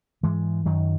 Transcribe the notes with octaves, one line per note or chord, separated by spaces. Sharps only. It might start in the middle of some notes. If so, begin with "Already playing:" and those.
G#2 E3 G#3
F#2 D#3 F#3